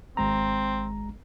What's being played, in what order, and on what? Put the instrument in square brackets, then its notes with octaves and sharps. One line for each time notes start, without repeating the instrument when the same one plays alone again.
[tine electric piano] G#1 G#3 A#5 [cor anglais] C4